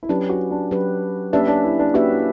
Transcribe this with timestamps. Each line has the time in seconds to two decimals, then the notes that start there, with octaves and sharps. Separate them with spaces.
0.03 E4
0.09 F#3 C#4 D4 G4 B4
0.29 F#4
0.51 D4
0.71 F#3 C#4 G4 B4
1.33 A#3 C#4 D4 G4 B4 E5
1.48 D4
1.64 E4
1.79 D4
1.94 A#3 C#4 F#4 G4 B4 E5
2.10 E4